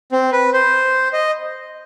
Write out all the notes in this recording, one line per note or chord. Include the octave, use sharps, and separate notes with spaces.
C4
B4
C5
D#5